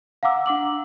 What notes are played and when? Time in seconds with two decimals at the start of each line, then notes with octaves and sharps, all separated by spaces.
0.23 F5 F#5 A#5 D6 E6
0.46 D4 F#5 D6 F#7